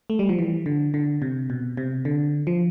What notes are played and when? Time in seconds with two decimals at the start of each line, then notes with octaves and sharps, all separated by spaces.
0.10 A3
0.19 G3
0.29 F3
0.39 E3
0.66 D3
0.94 D3
1.22 C3
1.50 B2
1.77 C3
2.05 D3
2.47 F3